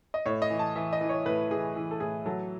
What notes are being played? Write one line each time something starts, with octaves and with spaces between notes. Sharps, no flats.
D#5
A2 C#5
D#5
E3
A5
E3 E5
D#5
E3
C#5
A2 B4
E3 G#4
E3
A4
A2 G#4
F#3 A4